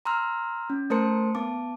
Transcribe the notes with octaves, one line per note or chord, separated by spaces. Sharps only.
A#5 C6 E6 F6
C#4
A3 A#4 C5 A5 C6 C#7
B3 A5 D6